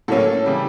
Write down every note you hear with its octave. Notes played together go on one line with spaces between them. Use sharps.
A2 F#3 A#3 C#4 A4
C#3 E3 G3